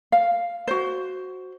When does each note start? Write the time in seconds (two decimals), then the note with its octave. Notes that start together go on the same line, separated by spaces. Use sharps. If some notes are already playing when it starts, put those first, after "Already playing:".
0.12 F5
0.67 F#4 C5